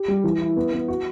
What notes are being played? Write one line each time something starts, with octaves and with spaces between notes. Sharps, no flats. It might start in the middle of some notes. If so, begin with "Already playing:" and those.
Already playing: G4
G3
E3
E4
B3
B3
F#4